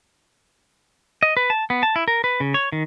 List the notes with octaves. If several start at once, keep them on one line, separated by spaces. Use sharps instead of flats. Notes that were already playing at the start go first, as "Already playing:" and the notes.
D#5
B4
A5
B3
A5
E4
A#4
B4
C#3
C#5
D#3